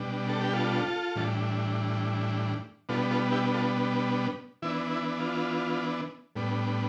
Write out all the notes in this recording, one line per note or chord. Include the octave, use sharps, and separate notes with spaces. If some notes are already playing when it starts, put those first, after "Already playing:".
Already playing: B2 G3 D4
A4
G4
F4 A4
A2 E3 G3 D4
B2 G3 B3 D4 F4 A4
F4 A4
E4 G4
F4 A4
E3 B3 D4 E4
E4
F4
A2 G3 B3 D4